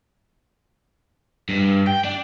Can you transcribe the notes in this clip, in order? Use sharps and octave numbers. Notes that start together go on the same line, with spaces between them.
G2
G5
D4